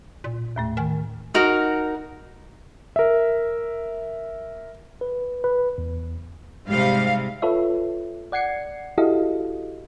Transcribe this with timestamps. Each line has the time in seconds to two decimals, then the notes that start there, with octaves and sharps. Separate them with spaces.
0.24 A#2
0.56 D#2 A2 A3
0.77 D#3 G#5
1.34 D#4 F#4 A#4
2.96 A#4 E5
5.01 B4
5.44 B4
5.78 E2
6.67 G#2 C3 G3 F5
7.42 F4 A4 B4 C#5 E5
8.32 D5 F#5 G#6 C7 C#7
8.98 E4 F#4 G4 A4 D#5 F5